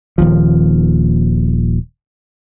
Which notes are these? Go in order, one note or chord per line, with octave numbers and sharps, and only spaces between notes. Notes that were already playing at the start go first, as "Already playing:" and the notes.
D#1 D#2 F3